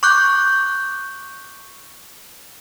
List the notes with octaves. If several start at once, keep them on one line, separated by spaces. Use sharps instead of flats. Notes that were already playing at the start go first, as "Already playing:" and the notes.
C#6 D6 F#6 G6